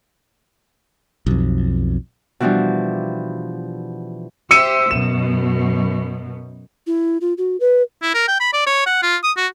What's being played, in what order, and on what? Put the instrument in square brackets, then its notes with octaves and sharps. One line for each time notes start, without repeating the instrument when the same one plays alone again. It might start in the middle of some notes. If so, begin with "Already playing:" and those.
[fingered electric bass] B1 F2
[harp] B2 E3 F3 G3 D4
[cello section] G4 C5 E5 [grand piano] E6 C#7 D#7
[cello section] F#2 B2 [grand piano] E7
[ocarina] E4
F4
F#4
B4
[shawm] E4
A#4
G5
B5
D5
C#5
F#5
F4
D#6
F#4